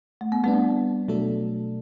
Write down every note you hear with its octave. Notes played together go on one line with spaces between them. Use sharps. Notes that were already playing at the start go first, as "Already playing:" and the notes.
A3
B3
G3 A3 B3 C4 D4
B2 F#3 A3 D4 A4